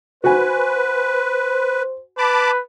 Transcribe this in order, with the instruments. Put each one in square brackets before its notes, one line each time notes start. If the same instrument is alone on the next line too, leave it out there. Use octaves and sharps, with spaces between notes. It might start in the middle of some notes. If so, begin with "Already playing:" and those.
[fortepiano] F#4 G#5 [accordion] B4 [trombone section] C5
[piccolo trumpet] B4 [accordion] A5 B5 D6